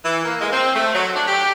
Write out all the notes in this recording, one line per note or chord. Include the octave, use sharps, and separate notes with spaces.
E3
A#3
G#3
C4
A3
F#3
D4
G4